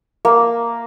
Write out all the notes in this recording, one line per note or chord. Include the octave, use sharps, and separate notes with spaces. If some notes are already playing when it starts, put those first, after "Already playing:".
A#3